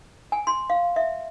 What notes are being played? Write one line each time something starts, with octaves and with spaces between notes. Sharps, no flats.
G#5
C6
F5
E5